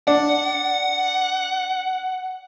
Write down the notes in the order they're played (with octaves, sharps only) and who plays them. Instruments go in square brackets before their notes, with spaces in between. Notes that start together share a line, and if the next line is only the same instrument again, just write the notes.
[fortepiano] D4 [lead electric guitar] F#5